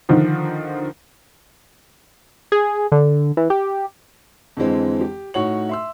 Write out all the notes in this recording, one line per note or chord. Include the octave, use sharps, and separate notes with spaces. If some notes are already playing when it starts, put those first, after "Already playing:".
D3 D#3 F3
G#4
D3
E3
G4
F2 D3 E3 G#3 C4
G4
A2 D#4 F#4 C#5 F#7
E5 C6 E6